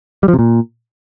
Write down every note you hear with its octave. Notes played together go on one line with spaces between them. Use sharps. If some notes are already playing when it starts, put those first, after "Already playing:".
G3
F3
C3
A#2